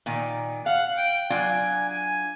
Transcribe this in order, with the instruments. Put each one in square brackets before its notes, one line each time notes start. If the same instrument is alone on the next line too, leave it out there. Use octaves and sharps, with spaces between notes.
[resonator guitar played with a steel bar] A#2 D#3
[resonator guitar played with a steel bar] F5 [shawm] F#5
[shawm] G5
[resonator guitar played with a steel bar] F#3 D4 F4 [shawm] G#5
[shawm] G#5